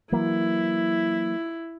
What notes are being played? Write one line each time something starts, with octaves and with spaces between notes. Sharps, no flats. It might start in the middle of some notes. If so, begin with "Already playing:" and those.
E3 F#3 A#3 E4